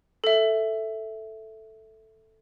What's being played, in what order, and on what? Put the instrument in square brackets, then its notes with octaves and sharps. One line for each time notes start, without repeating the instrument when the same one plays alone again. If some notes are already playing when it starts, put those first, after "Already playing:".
[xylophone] A4 E5